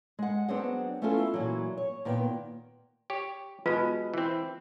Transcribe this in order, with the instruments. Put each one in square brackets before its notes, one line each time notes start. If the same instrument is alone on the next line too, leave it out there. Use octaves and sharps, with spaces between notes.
[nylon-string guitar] G#3 F#5
F#3 B3 C4 D4 G#4 F#5
A3 B3 C#4 E4 F4 A4
A#2 E3 F#3
C#5
A#2 D#3 B3 B4 G5
[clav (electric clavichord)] G4 C#5
[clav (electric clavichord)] B2 G#3 [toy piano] F4 B4 A#5
[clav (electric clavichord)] E3 C4